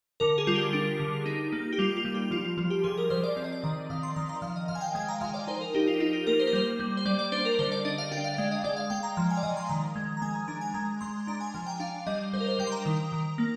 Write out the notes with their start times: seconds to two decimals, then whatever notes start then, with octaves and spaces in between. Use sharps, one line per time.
0.20 D3 A#4
0.38 G#4
0.47 G3 F4
0.55 G4
0.73 D4
1.00 D3
1.26 D#4
1.52 A#3
1.73 G4
1.78 G3 F4
1.97 F4
2.05 G3
2.14 G4
2.31 F3 F4
2.45 F4
2.57 F3 F4
2.70 G4
2.84 F3 G#4
2.98 A#4
3.10 F3 C5
3.24 D5
3.37 C4 D5
3.44 D#5
3.52 D5
3.64 D#3 D#5
3.90 D#3 F5
4.03 C6
4.16 D#3 A#5
4.29 A#5
4.42 F3 F5
4.56 D#5
4.68 F3 F5
4.75 G#5
4.81 G5
4.95 G#3 G#5
5.08 A#5
5.21 F3 F5
5.34 D5
5.47 D#4 C5
5.61 A#4
5.75 D#4 G4
5.87 F4
6.00 D#4 F4
6.13 G4
6.27 A#3 A#4
6.39 C5
6.47 A#4
6.53 G3 C5
6.80 G3
6.97 C5
7.05 G3 D5
7.19 D5
7.32 D4 C5
7.45 A#4
7.59 D3 C5
7.72 D5
7.85 D4 D#5
7.98 F5
8.11 D4 G5
8.24 F5
8.38 G#3 F5
8.51 D#5
8.64 G#3 D5
8.77 F5
8.90 G#3 G5
9.03 A#5
9.17 F3 A#5
9.30 G#5
9.37 D5
9.43 F3 D#5
9.57 C6
9.69 D#3 A#5
9.96 G#3
10.17 A#5
10.22 G#3 G#5
10.35 A#5
10.48 D4 A#5
10.61 G#5
10.74 G#3 A#5
11.01 G#3 C6
11.27 D4 A#5
11.41 G#5
11.54 F3 G#5
11.66 G5
11.80 D4 F5
12.07 G3 D#5
12.33 G3 C5
12.40 A#4
12.47 C5
12.59 G3 G5
12.67 C6
12.72 A#5
12.86 D#3
13.12 D#3
13.38 A#3